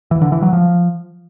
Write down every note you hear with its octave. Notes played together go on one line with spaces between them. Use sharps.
E3
D3
E3
F#3
F3